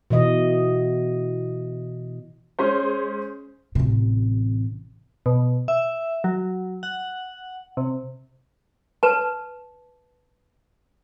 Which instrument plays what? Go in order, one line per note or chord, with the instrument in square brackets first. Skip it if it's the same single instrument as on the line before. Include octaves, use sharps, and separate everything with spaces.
[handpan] B2 E3 D#5
[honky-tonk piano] G#3 C#4 C5
[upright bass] A1 C3
[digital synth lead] B2
E5
F#3
F#5
C3
[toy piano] B4 A5